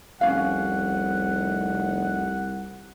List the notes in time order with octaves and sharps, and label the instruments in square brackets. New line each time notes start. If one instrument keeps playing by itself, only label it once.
[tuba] F1 [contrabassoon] C2 [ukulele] C#4 F4 F5 [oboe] F#5